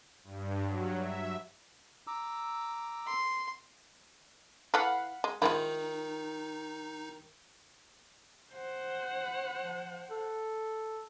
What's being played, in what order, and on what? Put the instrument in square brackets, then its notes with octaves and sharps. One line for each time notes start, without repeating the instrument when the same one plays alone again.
[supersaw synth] G2
F#3
E5
[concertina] A#5 D6 E6
[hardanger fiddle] C6
[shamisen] E3 A4 [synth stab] F5 F#5 B5
[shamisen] G#3
[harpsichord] D#3 [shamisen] F3 G#3 E4 [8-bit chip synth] D#4
[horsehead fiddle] C5 F#5
[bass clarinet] F3
A4